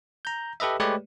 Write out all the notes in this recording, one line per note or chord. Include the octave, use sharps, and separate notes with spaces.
A#5 G6
G4 A4 B4 D#5 E5
G#3 A3 G4 B4 C#5 D5